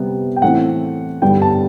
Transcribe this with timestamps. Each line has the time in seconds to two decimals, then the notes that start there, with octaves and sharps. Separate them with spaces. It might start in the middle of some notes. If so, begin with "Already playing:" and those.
Already playing: C3 G3 B3
0.36 G5
0.42 A2 E3 A3 C4 F#5
1.22 G2 D3 G3 B3 G5
1.42 A5